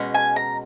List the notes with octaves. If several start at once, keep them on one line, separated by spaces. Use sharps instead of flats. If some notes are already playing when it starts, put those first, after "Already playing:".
Already playing: B2 G#3 C#4
G#5
A#5